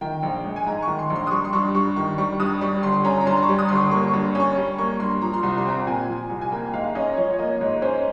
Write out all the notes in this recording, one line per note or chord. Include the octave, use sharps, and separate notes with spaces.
D#3 G5
A#1
G#3
G#5
G#2 A#5
D#3 C#6
C6
A#1
C6
D#6
G3 C#6
C6
G2 C#6
G2 C#6
D#3 C#6
G3 C#6
G2 D#6
G3 C#6
G1 C6
C#4 A#5
A#5
G2 C6
C#6
G3
D#6
G1 C6
C#6
A#3 C#6
C#6
G2
C#4 C#6
G3
A#3 C#6
G2 C6
F3 A#5
C6
C2 A#5
C6
C4 A#5
A#2 G#5
F3
C2
G#5
A#3 G5
G#2 F5
F5
C#4 D#5
F3 C#5
C#5
A#3 D#5
G#2 C#5
C#4 C5